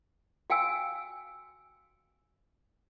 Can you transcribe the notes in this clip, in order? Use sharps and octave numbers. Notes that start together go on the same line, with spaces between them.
F#4 F5 G5 G#5 E6